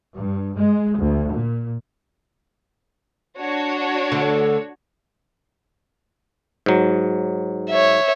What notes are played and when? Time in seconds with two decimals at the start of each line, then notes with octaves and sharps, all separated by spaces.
0.16 G2
0.58 G#3
0.98 D2
1.32 A#2
3.39 D4 F#4 C#5
4.12 D2 D3
6.66 G#2 F#3
7.70 C#5 E5